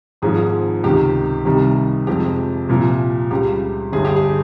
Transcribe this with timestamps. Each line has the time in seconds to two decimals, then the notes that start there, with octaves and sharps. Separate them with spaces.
0.22 G#1 G#2 F3 G#3 G#4
0.84 C#2 C3 D#3 G4
1.45 C2 C3 D#3 G3
2.07 F2 C3 F3 G#3 G4
2.69 C2 A#2 F3
3.31 C#2 C#3 G3 G4
3.93 G1 G2 G3 G#4
4.05 G4
4.16 G#4